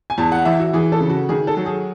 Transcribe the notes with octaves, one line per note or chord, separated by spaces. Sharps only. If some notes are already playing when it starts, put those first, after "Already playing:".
G#5
E2 A5
F#5
E3 E5
F#4
E3 G#4
A4
C#3
F#4
D#3 G#4
A4
F#3
G#4